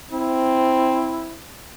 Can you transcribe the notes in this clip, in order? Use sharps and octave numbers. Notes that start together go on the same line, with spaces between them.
C4 E4